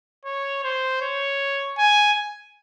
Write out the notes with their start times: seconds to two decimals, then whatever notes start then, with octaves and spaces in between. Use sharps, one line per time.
0.25 C#5
0.64 C5
1.01 C#5
1.78 G#5